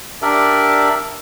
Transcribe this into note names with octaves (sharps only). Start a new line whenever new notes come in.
D4 G4 A#4 D5 E5